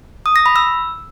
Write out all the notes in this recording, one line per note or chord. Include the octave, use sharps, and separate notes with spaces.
D#6
A#6
B5
E6